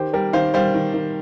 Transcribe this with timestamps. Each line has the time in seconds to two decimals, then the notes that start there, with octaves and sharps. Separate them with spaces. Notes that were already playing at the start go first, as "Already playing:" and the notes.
Already playing: D#3 G4 C5
0.13 G3 A#4
0.33 D#3 C5 F5
0.54 G3 C5 F5
0.74 D#3
0.94 D#3